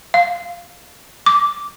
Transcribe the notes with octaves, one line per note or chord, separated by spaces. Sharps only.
F5
D6